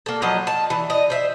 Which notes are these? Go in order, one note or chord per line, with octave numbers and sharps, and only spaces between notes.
A#3 A4
F3 F#3 B4 D#5
A5
E3
D#5
C5 E5